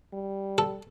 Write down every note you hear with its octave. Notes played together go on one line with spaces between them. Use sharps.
G3
A4